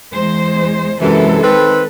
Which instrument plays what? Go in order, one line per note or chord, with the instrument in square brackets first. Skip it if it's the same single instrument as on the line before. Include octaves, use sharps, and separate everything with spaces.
[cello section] E2 G#3 C5
[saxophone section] F#2 C3 E3 [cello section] G#3 A4
[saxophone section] D#3 C4 B4